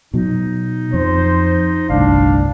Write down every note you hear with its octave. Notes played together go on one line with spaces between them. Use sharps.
B2 F#3 D#4
F2 C5
G1 C2 A2 D4 F5